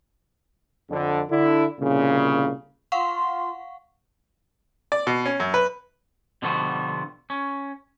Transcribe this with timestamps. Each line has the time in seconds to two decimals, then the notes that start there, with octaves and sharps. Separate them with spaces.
0.90 F2 D3
1.30 D3 E4
1.80 C2 A#2 C#3
2.92 F4 F5 F#5 C6 C#6
4.92 D5
5.07 B2
5.26 C#4
5.40 F#2
5.54 B4
6.42 B2 D3 F3 G3 B3 F#4
7.30 C#4